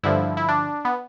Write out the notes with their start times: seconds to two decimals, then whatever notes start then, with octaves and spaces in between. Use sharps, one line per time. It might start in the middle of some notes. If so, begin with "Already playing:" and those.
0.03 G2 D3 F3 E4
0.37 E4
0.48 D4
0.85 B3